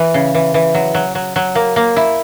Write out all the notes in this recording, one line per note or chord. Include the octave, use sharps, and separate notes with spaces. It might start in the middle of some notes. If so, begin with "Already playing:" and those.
Already playing: E3
C#3
E3
E3
F#3
F#3
F#3
F#3
A#3
A#3
E4